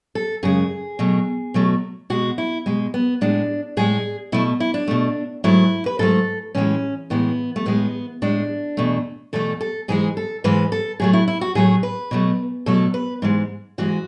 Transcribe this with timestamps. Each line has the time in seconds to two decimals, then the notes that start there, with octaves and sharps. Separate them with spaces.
0.15 A4
0.43 F#2 C#3 G#3 G#4
0.99 B2 F#3 A3
1.54 B2 F#3 A3
2.10 B2 G#3 F#4
2.38 E4
2.66 B2 G#3
2.94 B3
3.21 A2 G#3 D4
3.77 A2 G#3 G#4
4.32 B2 A3 E4
4.60 E4
4.74 D4
4.88 B2 A3
5.44 G#2 F#3 A3 E4
5.86 B4
5.99 G#2 F#3 A3 A4
6.55 A2 E3 G#3 C#4
7.10 A2 E3 G#3 B3
7.56 A3
7.66 A2 G#3 B3
8.22 A2 G#3 D4
8.77 E2 B2 A3
9.33 E2 B2 A3 A4
9.61 A4
9.88 G#2 E3 G#3 G#4
10.17 A4
10.44 G#2 E3 G#3 B4
10.72 A4
11.00 A2 F#3 A3 G#4
11.13 E4
11.28 E4
11.41 F#4
11.55 A2 F#3 A3 G#4
11.83 B4
12.11 B2 F#3 A3
12.66 B2 F#3 A3 A4
12.94 B4
13.22 G#2 E3 G#3
13.78 G#2 E3 G#3 F#4